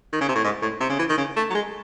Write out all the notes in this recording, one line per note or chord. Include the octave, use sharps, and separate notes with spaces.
D#3
C#3
C3
A2
G#2
A2
C3
C#3
E3
D#3
C#3
A3
F#3
G#3